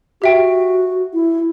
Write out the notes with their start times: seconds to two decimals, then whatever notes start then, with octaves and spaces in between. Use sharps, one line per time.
0.22 F#4 G4 E5 G5
1.13 E4